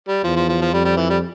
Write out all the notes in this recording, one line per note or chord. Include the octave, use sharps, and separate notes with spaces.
G3
E2 F3
F3
F3
F3
F2 G3
G3
E3
G3